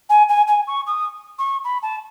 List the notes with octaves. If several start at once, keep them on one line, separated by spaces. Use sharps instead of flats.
G#5
G#5
G#5
C#6
D#6
C#6
B5
A5